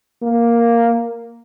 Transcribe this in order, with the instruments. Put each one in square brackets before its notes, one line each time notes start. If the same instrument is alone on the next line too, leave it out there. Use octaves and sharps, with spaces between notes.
[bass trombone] A#3